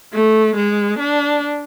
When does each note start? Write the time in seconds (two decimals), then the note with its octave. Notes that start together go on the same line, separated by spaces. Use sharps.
0.13 A3
0.56 G#3
0.99 D4